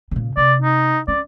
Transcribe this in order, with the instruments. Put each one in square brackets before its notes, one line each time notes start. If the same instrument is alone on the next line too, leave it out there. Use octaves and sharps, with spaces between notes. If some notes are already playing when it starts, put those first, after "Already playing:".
[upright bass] A#2 C#3
[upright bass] C3 [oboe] D5
[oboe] D#4
[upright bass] C#4 [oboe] D5